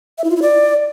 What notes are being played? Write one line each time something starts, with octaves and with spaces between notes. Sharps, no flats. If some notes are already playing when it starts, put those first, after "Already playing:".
E5
E4
F4
E4
D5